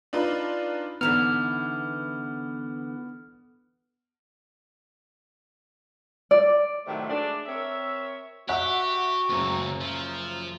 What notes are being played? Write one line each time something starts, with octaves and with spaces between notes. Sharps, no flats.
D4 D#4 F4 B4
D3 E3 B3 D#4 F6
D5
A2 C3 D#3 F#3 A3
G#3 A3 D4
C4 A#4 C#5 E5
F#4 G4 E5 F#5 F#6
F#1 C#2 F#2 A2
F3